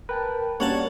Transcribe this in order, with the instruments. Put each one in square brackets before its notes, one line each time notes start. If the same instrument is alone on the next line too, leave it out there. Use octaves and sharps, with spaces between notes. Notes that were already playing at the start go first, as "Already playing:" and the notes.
[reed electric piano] A#4 G5 A5 [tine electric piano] B4
[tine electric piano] G3 D4 F#4 [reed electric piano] A#3 C#4 [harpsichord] C#5 F#5 A5